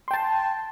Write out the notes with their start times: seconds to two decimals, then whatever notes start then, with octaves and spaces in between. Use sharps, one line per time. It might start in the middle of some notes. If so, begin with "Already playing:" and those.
0.08 C6
0.11 G5
0.14 A5